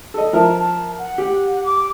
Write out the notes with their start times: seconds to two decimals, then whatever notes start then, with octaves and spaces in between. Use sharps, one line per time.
0.14 A4 D#5
0.33 F3 A#4 E5 A5
0.57 A5
0.98 F#5
1.18 G4
1.65 D6